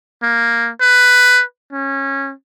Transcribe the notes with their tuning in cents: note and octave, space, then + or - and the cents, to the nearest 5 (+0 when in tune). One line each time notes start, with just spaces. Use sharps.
A#3 +0
B4 +5
C#4 -20